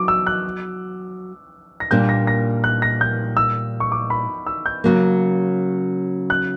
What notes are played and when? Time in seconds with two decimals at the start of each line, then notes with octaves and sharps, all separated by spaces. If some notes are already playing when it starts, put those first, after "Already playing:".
Already playing: F#3 C#6 D6
0.08 E6
0.27 F#6
1.80 A#6
1.91 A#2 G3 A#3 D4 G6
2.09 A#6
2.27 A#6
2.64 F#6
2.82 A#6
3.01 G6
3.37 E6
3.80 C#6
3.92 D6
4.10 B5
4.47 E6
4.66 G6
4.84 C#3 F#3 A#3
6.30 F#6